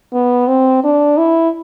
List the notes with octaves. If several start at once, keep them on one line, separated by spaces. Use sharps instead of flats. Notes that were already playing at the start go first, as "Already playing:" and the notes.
B3
C4
D4
E4